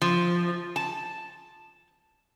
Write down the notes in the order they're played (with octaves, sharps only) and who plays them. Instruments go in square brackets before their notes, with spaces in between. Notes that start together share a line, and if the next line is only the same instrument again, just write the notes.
[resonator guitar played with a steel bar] F3
A5